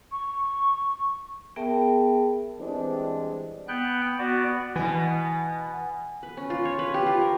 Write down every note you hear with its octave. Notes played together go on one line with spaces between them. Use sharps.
C#6
B3 G#4 A#4 E5 G5 A5
E3 G3 G#3 C4 D4
B3 G5 F#6
B3 F#4 D5
B2 E3 B3 G#5
B4
C#4
F4
C#5
B4
G4
F4
A#4